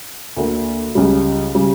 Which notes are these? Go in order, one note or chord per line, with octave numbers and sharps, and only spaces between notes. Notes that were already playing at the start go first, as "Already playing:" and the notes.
D2 D3 A#3
C#2 C#3 G3
C#3 G3